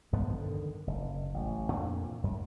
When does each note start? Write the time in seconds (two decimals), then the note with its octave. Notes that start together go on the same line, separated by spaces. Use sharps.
0.12 G#1 G2 F3 B3
0.33 D3 D#3
0.87 F#1
1.34 A1
1.71 F2 A#2 A#3 D4
2.24 F#2